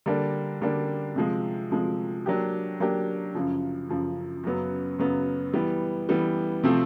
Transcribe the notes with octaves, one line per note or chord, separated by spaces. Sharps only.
D3 G3 A#3 D4
D3 G3 A#3 D4
C3 F3 G#3
C3 F3 G#3
F#3 A#3 D4 G4
F#3 A#3 D4 G4
F#2 C#3 F3
F#2 C#3 F3
F#2 C#3 F#3 B3
F#2 C#3 F#3 B3
E3 G3 B3
E3 G3 B3
C3 F3 A3 C4